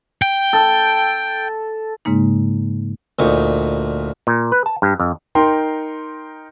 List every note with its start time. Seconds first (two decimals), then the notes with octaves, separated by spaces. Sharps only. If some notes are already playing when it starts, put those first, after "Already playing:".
0.22 G5
0.53 A4
2.05 G#2 C#3 G#3 A#3 D#4
3.19 D2 A#2 D#4 C#5
4.27 A#2
4.52 B4
4.66 A5
4.82 G2
5.00 F2
5.35 D#4 A#4 G5 C6